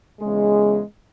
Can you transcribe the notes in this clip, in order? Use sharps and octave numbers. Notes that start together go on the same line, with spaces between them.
E2 C#3 G#3